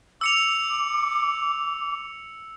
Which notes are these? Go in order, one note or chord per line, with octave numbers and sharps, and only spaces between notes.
D6 E6 C#7 F7